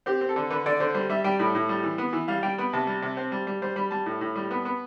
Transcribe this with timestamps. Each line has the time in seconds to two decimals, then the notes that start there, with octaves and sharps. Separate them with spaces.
0.06 C4 G4
0.21 C4
0.29 A4
0.36 D3
0.50 D3 B4
0.66 D3 D5
0.80 D3 C5
0.94 G3 C5
1.10 G3 E5
1.24 G3 G5
1.39 A2 B5
1.55 A2
1.69 G3
1.83 E3
1.98 B3
2.13 E3
2.28 G3 F5
2.43 G3 G5
2.58 B3 B5
2.73 C3 A5
2.87 G3
3.02 C3
3.17 C4
3.32 G3
3.47 G3
3.62 G3 C5
3.76 G3 B5
3.91 G3 A5
4.06 A2
4.21 A2
4.36 G3
4.51 B3
4.65 B3